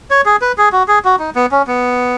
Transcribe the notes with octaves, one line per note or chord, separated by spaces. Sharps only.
C#5
G#4
B4
G#4
F#4
G#4
F#4
D#4
B3
C#4
B3